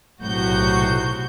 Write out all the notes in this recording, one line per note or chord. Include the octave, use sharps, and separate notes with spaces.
B1 A2 C3 F#4 G6